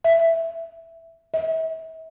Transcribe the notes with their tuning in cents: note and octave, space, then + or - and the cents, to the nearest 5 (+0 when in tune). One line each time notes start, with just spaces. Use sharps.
E5 +5
E5 -35